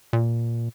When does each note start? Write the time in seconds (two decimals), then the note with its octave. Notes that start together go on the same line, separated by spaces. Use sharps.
0.13 A#2